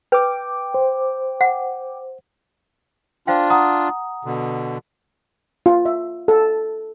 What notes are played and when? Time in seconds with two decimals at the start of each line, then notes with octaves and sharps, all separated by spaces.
0.12 B4 G5 D6
0.74 C5
1.41 F#5
3.27 D4 F4 C5 F5 G5
3.50 F#5 A#5 D#6
4.25 B2 D3
5.66 F4
5.86 E5
6.28 A4